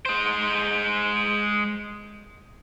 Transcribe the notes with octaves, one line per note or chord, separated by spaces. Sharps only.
G#3 C5